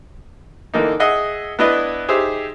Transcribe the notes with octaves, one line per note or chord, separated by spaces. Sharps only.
D3 E3 A#3 D#4
G#4 D#5 E5 F#5
B3 D4 E4 B4 D#5
D#4 G4 G#4 C5 E5